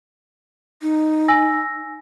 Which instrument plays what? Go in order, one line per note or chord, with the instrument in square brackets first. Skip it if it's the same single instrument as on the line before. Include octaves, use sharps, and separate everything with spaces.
[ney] D#4
[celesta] G#5 E6 A#6